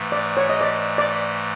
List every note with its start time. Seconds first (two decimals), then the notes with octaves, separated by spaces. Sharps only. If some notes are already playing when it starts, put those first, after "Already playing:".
Already playing: G#2 E3 A3
0.12 D5
0.37 C#5
0.49 D#5
0.61 D5
0.98 D5